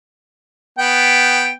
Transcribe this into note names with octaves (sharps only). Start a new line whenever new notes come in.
B3 G5